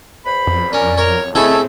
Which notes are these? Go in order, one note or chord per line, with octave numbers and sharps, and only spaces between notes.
E2 C5 B5
F2
C#4 A#4 D5
A#4 C#5
C#3 A3 C4 E4 A4 D#5 G#5 A5